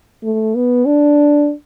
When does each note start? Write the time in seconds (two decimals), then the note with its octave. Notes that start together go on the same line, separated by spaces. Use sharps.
0.23 A3
0.55 B3
0.86 D4